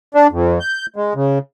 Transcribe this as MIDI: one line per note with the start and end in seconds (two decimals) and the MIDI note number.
0.15 0.27 62
0.32 0.59 41
0.60 0.86 91
0.96 1.14 56
1.15 1.39 49